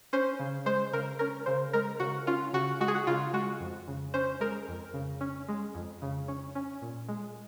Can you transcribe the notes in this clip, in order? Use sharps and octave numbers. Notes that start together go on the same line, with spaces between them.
C#4 C5
C#3
G#3 C5
C#3 A#4
C#4 A#4
C#3 C5
G#3 A#4
C#3 F#4
C#4 F4
C#3 F#4
G#3 F#4
G#4
F#4
C#3 F4
G#3 F#4
F2
C#3
C#4 C5
G#3 A#4
F2
C#3
C#4
G#3
F2
C#3
C#4
C#4
A#2
G#3